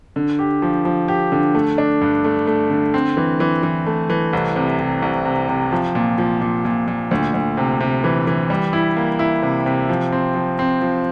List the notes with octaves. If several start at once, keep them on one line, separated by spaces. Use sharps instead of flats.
D3
G4
F3
F3
G4
D3
A3
D4
G2
A3
A3
D3
C4
E3
E3
E3
A3
E3
C2
C3
C3
C2
C3
C3
F3
A#2
F3
A#2
A#2
A#2
D2
D2
C3
C3
E3
E3
G3
E4
A#3
E4
C3
C3
F3
C4
F3
C4
F3